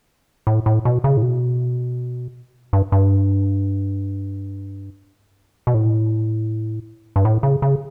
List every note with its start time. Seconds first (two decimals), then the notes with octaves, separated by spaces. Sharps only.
0.47 A2
0.66 A2
0.85 B2
1.04 C#3
1.17 A2
1.22 B2
2.73 G2
2.92 G2
5.67 B2
5.74 A2
7.16 G2
7.25 A2
7.43 C#3
7.62 C#3